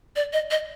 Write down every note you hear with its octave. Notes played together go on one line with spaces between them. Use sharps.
D5
D#5
D#5